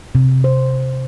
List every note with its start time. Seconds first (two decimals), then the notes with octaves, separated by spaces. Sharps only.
0.15 C3
0.44 C5